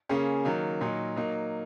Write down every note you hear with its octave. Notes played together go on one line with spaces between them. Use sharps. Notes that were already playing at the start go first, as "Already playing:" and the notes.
C#3 A#3 C#4 G#4
D#3 F#3 A#3
A#2 F#3 D#4
F#3 A#3 D#4